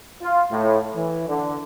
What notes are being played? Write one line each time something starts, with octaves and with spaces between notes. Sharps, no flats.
F4
A2
E3
D3